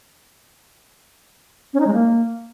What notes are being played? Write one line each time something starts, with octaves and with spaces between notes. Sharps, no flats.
C#4
D#4
G#3
A#3